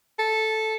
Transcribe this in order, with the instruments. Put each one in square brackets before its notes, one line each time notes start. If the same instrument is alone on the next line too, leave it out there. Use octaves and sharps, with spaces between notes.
[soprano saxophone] A4